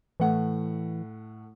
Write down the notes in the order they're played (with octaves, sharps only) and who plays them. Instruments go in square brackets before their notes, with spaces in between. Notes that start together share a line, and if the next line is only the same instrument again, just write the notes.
[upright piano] A2 A3 F#5 [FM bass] E3